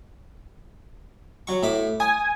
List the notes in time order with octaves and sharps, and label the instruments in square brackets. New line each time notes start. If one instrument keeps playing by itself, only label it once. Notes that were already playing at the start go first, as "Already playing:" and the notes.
[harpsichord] F#3 C#6
A2 E5 D6
[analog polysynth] G#5 [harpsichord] D#6